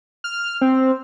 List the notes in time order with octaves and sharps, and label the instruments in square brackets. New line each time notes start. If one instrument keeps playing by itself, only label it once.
[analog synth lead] F6
C4